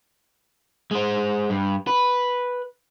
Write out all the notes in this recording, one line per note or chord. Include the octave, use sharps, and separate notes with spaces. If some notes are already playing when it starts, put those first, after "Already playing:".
G#3 C5
G2
B4